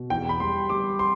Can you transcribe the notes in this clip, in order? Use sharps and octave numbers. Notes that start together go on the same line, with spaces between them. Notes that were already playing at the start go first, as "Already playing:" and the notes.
Already playing: B2
E2 G5
B5
G3 C6
G3 D6
C6